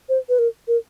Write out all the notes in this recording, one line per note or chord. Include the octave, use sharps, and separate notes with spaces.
C5
B4
A#4
A#4